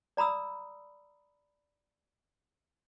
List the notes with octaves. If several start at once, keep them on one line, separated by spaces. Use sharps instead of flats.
D5 A#5 B5 D#6 E6